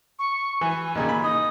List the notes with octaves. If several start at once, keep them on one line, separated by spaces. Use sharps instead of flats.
C#6
E3 G#5
D#2 A#2 C#3
B5
D#4 D#6